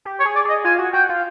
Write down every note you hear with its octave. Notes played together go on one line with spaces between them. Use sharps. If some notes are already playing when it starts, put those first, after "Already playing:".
G4
C#5
G#4
D5
G#4 D#5
F4 G#5
F#4
F#4 G5
F4